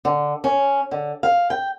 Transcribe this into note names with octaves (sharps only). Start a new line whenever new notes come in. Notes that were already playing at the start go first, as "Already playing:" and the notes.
D3
C#4
D3
F5
G5